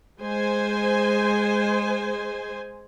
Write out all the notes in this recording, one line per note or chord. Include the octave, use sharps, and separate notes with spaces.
G#3 C5 G#5